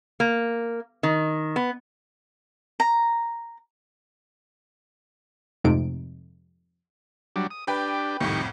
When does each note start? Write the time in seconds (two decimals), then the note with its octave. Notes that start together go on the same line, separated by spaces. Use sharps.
0.20 A#3
1.03 D#3
1.56 B3
2.80 A#5
5.64 F2 G#2 C3 A3 D#4 D7
7.36 F#3 G3 D4
7.51 D#6
7.67 D4 G4 B4 G5 B5
8.20 C2 F2 A2 D#3 G4 C#6